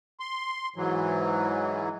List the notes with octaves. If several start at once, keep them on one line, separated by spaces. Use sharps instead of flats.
C6
G#2 E3 F#3